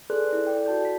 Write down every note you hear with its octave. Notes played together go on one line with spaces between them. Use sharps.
G#4 A4 B4 D5 C6 F#6
E4
A4 D5 G5
F#4 A5 G6
B6